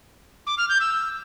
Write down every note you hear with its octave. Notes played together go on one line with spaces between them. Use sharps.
D6
F6
G6
E6